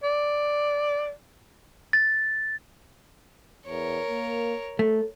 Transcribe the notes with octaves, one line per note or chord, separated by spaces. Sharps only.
D5
A6
E2 A#4 C#5
A#3
A3 A4